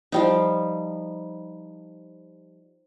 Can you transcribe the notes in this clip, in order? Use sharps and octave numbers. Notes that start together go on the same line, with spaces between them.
F3 G3 D#4